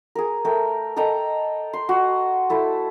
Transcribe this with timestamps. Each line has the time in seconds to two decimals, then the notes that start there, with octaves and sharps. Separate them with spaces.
0.15 G#4 A#4
0.45 A3 A#4 G5
0.96 A4 D#5 G5 A#5
1.73 C6
1.89 F#4
2.50 A3 E4 A4